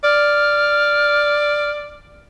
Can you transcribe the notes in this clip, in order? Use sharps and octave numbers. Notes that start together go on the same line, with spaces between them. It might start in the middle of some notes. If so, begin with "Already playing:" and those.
D5 F6